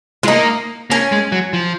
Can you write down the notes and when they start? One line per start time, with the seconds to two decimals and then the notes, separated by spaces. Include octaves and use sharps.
0.23 G#3 F4
0.28 A#3 D#4
0.90 A#3 C#4
1.12 G#3
1.32 F#3
1.53 F3